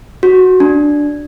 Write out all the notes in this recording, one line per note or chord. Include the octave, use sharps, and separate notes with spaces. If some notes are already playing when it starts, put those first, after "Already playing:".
F#4
D4